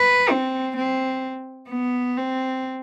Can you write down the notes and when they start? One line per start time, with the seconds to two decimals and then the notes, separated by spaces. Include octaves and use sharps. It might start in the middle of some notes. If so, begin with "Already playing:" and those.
Already playing: B4
0.30 C4
0.77 C4
1.70 B3
2.18 C4